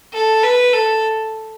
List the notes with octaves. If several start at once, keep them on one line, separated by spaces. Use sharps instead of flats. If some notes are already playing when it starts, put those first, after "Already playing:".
A4
B4
A4